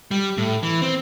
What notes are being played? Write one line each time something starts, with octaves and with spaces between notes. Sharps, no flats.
G3
A2
E3
C4